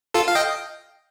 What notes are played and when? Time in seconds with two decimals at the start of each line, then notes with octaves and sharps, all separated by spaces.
0.14 F4 A4
0.28 F5
0.35 D#5 G5